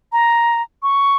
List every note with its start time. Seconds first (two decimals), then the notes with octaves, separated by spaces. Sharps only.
0.12 A#5
0.83 C#6